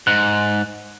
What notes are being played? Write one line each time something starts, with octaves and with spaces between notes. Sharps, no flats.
G#2 F#6